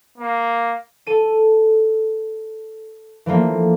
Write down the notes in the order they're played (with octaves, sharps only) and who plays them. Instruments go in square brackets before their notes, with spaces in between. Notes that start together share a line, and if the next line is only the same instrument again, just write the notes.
[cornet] A#3
[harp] A4 D#7
E3 F3 A3 A#3 D4